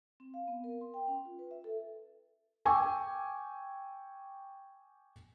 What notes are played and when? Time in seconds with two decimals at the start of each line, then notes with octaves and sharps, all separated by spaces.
0.20 C4
0.34 F5
0.48 B3
0.64 A#4
0.81 C6
0.94 G5
1.08 C#4
1.25 F4
1.39 B4
1.51 E5
1.64 A4
2.65 G5 G#5 C#6 D6 E6